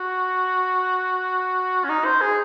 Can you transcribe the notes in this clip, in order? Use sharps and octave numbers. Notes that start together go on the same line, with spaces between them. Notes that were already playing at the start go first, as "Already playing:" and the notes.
Already playing: F#4
C#4
D#4
C5
G#4